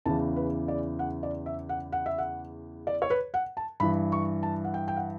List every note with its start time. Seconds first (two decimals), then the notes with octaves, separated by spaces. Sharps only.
0.06 E2 C#3 E3 A5
0.36 B4
0.68 D5
0.99 F#5
1.23 D5
1.46 E5
1.69 F#5
1.92 F#5
2.06 E5
2.18 F#5
2.87 D5
3.02 C#5
3.10 B4
3.34 F#5
3.57 A5
3.80 G2 E3 B5
4.12 C#6
4.43 A5
4.64 F#5
4.74 G5
4.88 G5
4.97 F#5